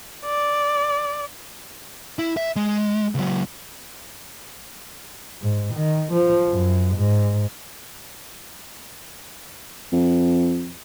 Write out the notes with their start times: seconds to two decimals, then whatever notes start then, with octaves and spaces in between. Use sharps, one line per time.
0.25 D5
2.19 E4
2.37 E5
2.56 G#3
3.15 C#2 F#3
5.42 G#2
5.74 D#3
6.13 F3
6.49 F#2
6.96 G#2
9.93 F2